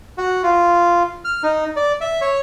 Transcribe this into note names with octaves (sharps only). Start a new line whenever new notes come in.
F#4
F4
F6
D#4
D5
E5
C#5